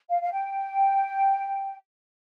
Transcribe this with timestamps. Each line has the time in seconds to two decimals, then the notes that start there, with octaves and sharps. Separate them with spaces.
0.09 F5
0.22 F5
0.32 G5